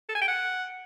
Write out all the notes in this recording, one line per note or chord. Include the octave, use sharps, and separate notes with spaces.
A4
G#5
G5
F#5